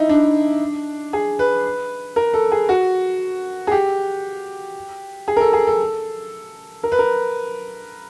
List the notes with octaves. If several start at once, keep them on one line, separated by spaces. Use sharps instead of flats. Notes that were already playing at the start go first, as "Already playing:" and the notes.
Already playing: D#4 E4
D4
G#4
B4
A#4
A4
G#4
F#4
G#4
G4
G#4
A#4
A4
G#4
A4
A#4
B4
A#4